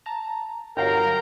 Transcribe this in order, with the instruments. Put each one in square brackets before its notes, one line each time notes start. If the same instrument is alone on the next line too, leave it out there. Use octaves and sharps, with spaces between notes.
[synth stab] A5 A#5
[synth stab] G1 F#3 F5 [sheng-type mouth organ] A#4 G5 A#5